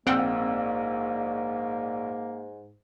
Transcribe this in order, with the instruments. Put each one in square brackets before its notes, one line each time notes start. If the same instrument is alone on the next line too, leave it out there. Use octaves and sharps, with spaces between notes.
[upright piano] A#1 E6 [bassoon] G#2 [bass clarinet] A#3 [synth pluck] C4 F#5 G5